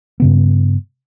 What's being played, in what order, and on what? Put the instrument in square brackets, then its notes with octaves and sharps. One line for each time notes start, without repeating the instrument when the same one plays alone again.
[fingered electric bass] G2 C#3 B3